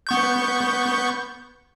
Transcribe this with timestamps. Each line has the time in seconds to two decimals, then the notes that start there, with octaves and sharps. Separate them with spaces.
0.07 B3 C#6 G6